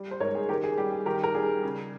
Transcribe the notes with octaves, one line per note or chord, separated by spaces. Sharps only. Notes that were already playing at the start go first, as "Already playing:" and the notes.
Already playing: G3
C5
G#2 A#4 C#5
G#4
D#3 G4 A#4
G#4
G3 G4
G#4
D#3 G4 A#4
A#4
G3 G#4
C#3